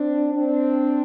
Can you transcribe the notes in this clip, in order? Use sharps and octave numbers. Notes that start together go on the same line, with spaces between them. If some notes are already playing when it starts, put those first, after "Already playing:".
Already playing: C4 D4
C4 D4